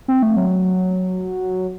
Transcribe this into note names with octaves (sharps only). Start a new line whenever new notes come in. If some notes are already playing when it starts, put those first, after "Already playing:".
C4
A3
F#3